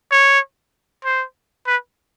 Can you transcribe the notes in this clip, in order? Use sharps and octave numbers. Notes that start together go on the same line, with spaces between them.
C#5
C5
B4